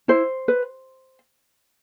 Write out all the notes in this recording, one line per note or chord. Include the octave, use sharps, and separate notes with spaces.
E4 C5
B4